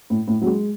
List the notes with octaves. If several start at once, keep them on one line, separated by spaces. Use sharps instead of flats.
A2
A2
F#3
G#3